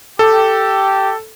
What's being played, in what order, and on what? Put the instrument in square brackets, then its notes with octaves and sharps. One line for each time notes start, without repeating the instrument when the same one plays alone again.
[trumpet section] G4 [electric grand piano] A4